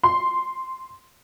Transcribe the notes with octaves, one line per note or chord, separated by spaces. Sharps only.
C6